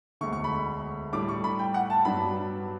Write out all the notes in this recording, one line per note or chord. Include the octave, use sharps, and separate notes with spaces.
E1 D2 D3 C#6
C#6
B5
A2 G3 D4 D6
C#6
B5
G5
F#5
A5
G2 F#3 B3 D4 B5